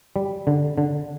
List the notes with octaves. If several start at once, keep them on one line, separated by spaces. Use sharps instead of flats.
G3
D3
D3